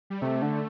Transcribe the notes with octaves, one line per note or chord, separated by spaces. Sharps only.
G3
C3 A3
D3